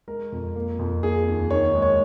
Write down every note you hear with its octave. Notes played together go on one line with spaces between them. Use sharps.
G#3 A#4
F2
A#3
F2
A#3 G#4
D#2
D#3 C#5
G#3
C#5